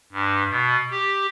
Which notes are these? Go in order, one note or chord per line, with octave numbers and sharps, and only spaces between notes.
G2
B2
G4